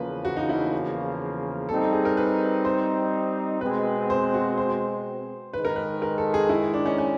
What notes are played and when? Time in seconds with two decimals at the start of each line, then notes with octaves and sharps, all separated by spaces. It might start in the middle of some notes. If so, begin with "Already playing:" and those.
Already playing: E2 C#3 F3 A#3 B4
0.25 F#4
0.37 D#4
0.49 E4
1.69 G3 C4 D#4 A4
1.93 G#4
2.05 A#4
2.17 B4
2.65 C5
3.61 B2 G#3 C4 B4
4.10 C5
4.34 F#4
4.58 C5
5.53 G#2 D#3 G#3 B4
5.65 A#4
5.76 B4
6.02 A#4
6.18 A4
6.34 G#4
6.49 E4
6.74 D4
6.86 C#4
6.98 C#4